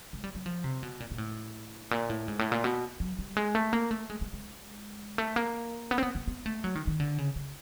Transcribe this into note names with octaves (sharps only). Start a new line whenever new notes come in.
G#3
G3
F#3
F3
C3
B2
A#2
A#2
A2
A#2
A2
G#2
A2
A#2
B2
F#3
G3
G#3
A3
A#3
A3
G#3
G#3
G#3
A3
A#3
B3
C4
B3
B3
B3
A3
F#3
D#3
D#3
D3
C#3
C#3